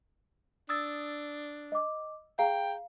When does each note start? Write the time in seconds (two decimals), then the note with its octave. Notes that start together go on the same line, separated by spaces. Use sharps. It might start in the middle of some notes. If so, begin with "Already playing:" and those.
0.69 D4 D#6 E6 A6
1.72 D#5 D6
2.39 G#4 F5 G5 A#5